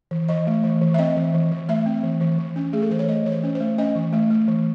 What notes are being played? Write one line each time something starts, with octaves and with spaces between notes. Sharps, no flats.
E3
E3 D#5
A3
E3
E3
E5
C4 D#5
E3
E3
E3
A3 E5
C4
E3
E3
E3
C#4
A3 G#4
A4
E3 C5
C#5
A3 D#5
E3 C#5
C5
C#4
C5
A3
C#4 D#5
E3
A3
A3
E3